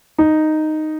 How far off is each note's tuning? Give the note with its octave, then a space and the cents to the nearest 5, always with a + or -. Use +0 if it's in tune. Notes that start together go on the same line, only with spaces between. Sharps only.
D#4 -5